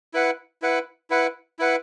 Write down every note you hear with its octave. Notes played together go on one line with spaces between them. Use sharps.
E4 B4 F#5
E4 B4 F#5
E4 B4 F#5
E4 B4 F#5